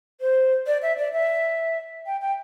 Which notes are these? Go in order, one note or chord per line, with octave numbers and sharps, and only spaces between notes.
C5
D5
E5
D5
E5
G5
G5